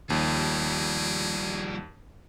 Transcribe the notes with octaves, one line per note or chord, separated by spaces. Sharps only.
D#2 F3 G3 G#4